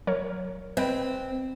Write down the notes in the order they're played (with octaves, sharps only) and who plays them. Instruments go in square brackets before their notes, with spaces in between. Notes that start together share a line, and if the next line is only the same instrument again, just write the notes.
[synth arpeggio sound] F#3 A#4 C#5
[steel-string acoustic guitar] C4 [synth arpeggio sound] B4 D#5 G5